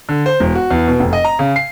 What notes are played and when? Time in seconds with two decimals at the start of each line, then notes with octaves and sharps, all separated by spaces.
0.09 D3
0.26 C5
0.40 E1
0.55 F#4
0.71 E2
0.88 B2
1.00 F1
1.13 D#5
1.25 A#5
1.39 C#3
1.56 C7